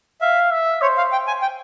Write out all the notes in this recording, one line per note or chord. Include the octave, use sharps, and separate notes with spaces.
E5 F5
E5
C5 C#5
F5
G5
G#5
G5